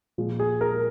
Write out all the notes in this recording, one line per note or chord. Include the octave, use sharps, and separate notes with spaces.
A#2 F3 G#3
G#4
A#4